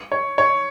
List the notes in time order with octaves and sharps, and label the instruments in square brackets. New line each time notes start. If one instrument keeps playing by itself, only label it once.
[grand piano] C#5
C#5